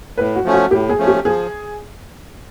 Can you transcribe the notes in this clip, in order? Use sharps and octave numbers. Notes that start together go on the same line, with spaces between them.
A2 B4
F#4
F3 A3 C#4
F#4
A2 G4
G#4
F3 A3 C#4
G4
F3 G#4